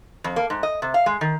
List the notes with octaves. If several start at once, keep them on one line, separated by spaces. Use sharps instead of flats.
F2
A#3
G#2
D#5
C3
F5
G#3
D#3